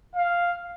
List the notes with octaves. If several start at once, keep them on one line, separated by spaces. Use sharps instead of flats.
F5